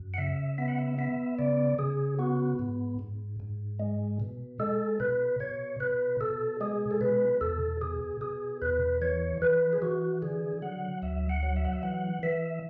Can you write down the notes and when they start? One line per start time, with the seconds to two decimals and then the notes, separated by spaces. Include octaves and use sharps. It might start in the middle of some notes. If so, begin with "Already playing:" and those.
Already playing: F#2
0.14 F#5
0.18 C#3 E5
0.58 B3 E5
0.68 F#5
0.79 E5
0.98 B3 E5
1.38 C#3 D5
1.79 C#3 G#4
2.19 B3 F#4
2.59 G#2
2.99 G#2
3.40 G#2
3.79 G#3
4.20 B2
4.60 G#3 A4
5.00 B2 B4
5.40 B2 C#5
5.80 B2 B4
6.21 B2 A4
6.61 G#3 G#4
6.91 A4
7.01 B2 B4
7.41 E2 A4
7.81 B2 G#4
8.21 B2 G#4
8.62 E2 B4
9.02 E3 C#5
9.42 E3 B4
9.73 G#4
9.82 E3 F#4
10.22 D3 G#4
10.62 F#3 F#5
11.02 D2 E5
11.29 F#5
11.43 F#3
11.56 E5
11.65 F#5
11.73 E5
11.83 E3 F#5
12.23 E3 E5